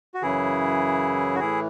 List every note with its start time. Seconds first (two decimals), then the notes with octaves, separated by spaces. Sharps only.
0.14 F#4
0.22 F#2 C#3 E3 E4 G#4
1.35 F#4
1.39 A2 E3 E4 G#4